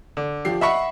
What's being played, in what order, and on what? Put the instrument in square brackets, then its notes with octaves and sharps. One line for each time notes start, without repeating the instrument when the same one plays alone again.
[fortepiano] D3
[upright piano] F3 G4 C7
[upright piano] D#5 F#5 [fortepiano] E5 B5 C#6